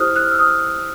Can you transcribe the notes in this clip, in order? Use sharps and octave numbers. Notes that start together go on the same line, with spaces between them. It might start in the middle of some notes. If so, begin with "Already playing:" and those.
Already playing: E4 G4 C5 D#6 F6 F#6
F#6
F6
E6
D#6 F6